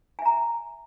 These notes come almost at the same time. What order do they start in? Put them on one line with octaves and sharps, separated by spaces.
G#5 E5 A#5